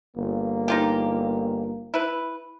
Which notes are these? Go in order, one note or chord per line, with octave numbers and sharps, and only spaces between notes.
G1 A#3
D#4 F4 G4
E4 B4